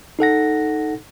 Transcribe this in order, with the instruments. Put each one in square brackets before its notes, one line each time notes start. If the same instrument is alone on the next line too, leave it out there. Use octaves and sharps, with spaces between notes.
[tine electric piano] D#4 A4 F#5 A#6